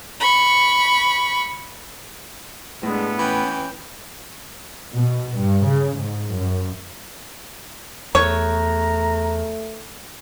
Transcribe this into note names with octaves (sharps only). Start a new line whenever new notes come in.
B5 C#6
A2 G#3 B3 D4
E3 C#4 G5
B2
G2
C#3
G#2
F#2
E2 A3 C#5 A#5